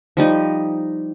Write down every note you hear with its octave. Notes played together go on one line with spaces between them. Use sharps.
F3 G3 D#4 D#5